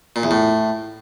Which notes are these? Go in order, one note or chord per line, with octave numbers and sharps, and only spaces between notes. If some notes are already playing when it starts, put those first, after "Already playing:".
A#2
E2
A2